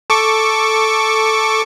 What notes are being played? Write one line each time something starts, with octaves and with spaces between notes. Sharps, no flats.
A4 C#6 D6